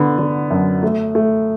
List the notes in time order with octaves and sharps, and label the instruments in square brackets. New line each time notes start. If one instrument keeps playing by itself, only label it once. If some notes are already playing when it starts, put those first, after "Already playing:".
Already playing: [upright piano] D3 B3
D3
F#2
A3
A3